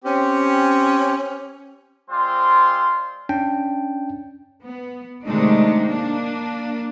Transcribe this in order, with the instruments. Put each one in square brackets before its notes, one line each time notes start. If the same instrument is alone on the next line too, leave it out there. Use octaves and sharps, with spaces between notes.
[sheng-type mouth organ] C4 G4 [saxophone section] C#4
[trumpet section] G#3 C4 F4 C5 D5
[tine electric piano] C#4 D4 G5 A5
[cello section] B3
C3 D#3 G#3 A3 D4 D#4
A#3 D4